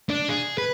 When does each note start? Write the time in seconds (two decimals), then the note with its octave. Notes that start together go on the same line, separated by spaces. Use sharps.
0.09 D4
0.29 G#4
0.58 B4